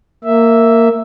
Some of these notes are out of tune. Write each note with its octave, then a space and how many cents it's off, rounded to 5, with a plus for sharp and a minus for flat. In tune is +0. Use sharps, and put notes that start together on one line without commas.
A#3 -15 E5 +0